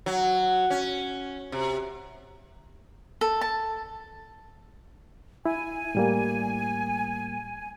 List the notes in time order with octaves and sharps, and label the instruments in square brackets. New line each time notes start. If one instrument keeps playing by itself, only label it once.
[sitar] F#3
C#4
C3
[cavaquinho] A4
A5
[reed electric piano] E4 [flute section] G#5
[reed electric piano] A2 G3 A#3